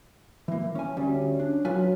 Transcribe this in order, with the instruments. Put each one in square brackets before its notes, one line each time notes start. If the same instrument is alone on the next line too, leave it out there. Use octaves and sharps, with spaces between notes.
[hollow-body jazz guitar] E3 A#3
C#4 G#5
[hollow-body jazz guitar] D2 G3 [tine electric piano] C#4
[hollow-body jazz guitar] D4
[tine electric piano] F#3 [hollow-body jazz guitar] F4 B4 G#5